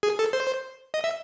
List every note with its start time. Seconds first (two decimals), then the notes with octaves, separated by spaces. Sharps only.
0.03 G#4
0.19 A4
0.33 C5
0.94 D#5
1.04 E5